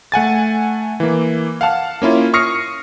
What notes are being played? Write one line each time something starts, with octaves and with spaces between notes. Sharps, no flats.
A3 F#5 G#5 A6
E3 A#3
F5 F#5 A5 F6
A#3 C#4 E4 F4
C#6 D#6 F6 A#6 C7 C#7